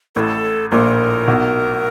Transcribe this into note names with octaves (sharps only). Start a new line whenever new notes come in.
A1 A2 A4 A#4
A#1 A#2 A#4
B1 B2